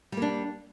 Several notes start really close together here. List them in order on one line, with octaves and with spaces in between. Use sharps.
G3 A#3 D4